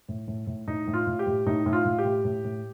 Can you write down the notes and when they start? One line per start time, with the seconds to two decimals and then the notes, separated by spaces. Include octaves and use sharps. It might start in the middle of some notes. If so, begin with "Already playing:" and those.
0.09 A2
0.28 A2
0.47 A2
0.67 A2 D#4
0.87 A2
0.94 F4
1.07 A2
1.19 G4
1.27 A2
1.46 A2 D#4
1.66 A2
1.73 F4
1.85 A2
1.99 G4
2.04 A2
2.25 A2
2.45 A2